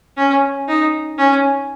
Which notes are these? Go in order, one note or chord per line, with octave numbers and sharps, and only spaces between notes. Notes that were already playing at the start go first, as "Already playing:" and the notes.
C#4
D#4
C#4